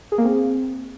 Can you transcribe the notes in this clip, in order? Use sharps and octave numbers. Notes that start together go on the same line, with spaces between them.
G#4
A#3
C4